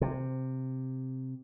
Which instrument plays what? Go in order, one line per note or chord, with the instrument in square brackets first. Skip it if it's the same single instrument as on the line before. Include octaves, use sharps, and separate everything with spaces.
[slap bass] C3